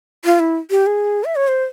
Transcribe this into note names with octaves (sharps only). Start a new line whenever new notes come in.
F4
E4
G4
G#4
E5
C#5
C5